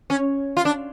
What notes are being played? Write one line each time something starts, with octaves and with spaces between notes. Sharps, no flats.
C#4
F4
D4